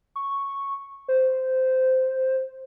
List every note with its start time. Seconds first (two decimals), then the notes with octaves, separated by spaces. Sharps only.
0.16 C#6
1.08 C5